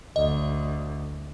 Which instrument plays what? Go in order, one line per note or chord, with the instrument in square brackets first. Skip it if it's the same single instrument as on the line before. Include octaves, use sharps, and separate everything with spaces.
[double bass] D2 [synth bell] D#5